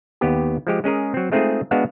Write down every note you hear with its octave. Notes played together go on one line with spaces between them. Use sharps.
D#2 B3 G4
F3 G#3 G4
G#3 C#4 G#4 A#4
F#3 C4
G#3 A3 C4 D#4 F4 G#4
G#3 B3 D4 F#4 F5